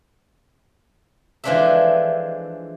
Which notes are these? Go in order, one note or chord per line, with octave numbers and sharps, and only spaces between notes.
E3 F3 G#3 D4 A4 E5